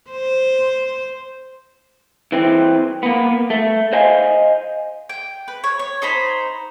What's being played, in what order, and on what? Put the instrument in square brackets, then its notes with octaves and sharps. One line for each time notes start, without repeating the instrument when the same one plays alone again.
[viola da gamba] C5
[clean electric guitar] E3 C4
A#3 B3
A3
C5 D#5 F5 G#5
[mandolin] G5
B4
C#5
C#5
D#4 C5 A#5 B5